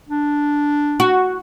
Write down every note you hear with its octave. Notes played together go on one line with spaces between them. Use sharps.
D4
F#4